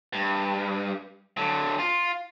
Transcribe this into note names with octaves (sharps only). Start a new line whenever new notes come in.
G2
D3 F#3
F4